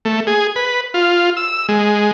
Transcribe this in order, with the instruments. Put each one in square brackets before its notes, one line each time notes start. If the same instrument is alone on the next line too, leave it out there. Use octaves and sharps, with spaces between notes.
[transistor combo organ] A3
G#4
B4
F4
E6
G#3